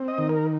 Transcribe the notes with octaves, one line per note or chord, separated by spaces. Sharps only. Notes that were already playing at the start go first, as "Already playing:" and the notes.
Already playing: C4
D#5
D#3
A#4